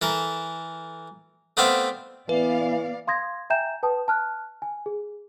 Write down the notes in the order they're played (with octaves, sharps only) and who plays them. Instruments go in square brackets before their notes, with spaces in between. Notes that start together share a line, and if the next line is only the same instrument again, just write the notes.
[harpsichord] E3 A4 A#4
A3 B3 C4 D4 E5 F5
[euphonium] E3 [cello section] B3 D5 F5 [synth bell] B4
[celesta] F5 C6 D#6 G#6 A#6
E5 G5 G#5 A#5 G6 E7
B4 G5 A5 D#6
A5 F6 F#6
G#5
G#4